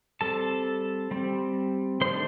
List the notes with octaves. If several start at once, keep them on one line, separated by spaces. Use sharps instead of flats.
G3 C4 A4 A5
G3 C4
D#3 A3 D4 C5 C6